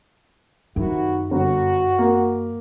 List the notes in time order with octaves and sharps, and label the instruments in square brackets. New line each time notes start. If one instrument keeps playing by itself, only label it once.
[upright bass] F#2 [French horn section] C3 E4 F#4 [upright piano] D#3 D#4
[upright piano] G1 [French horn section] F#4
[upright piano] A#3